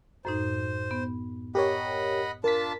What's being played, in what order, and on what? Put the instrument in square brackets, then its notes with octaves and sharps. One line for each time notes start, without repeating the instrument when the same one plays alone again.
[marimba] F#2 A2 D#4 [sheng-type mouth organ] C5
[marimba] B3
[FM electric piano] G4 A#4 C#5 [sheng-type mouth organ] D#5 F#5 B5
[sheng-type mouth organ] D4 F4 A5 [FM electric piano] A#4 B6